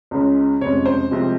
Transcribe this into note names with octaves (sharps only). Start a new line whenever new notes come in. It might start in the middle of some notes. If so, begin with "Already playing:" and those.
C#2 C#3 G#3
F1 F2 C#3 G#3 C#5
C5
C2 C3 F3 G#3